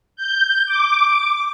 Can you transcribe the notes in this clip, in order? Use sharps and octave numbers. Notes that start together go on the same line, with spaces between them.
G6
D6